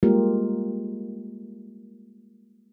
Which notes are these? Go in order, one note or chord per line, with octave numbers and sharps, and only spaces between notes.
G3 G#3 A#3 F4 G4 A#4